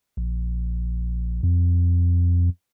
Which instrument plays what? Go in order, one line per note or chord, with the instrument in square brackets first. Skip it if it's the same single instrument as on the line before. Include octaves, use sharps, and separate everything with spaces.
[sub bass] A#1
F2